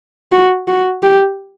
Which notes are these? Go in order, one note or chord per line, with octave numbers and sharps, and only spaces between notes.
F#4
F#4
G4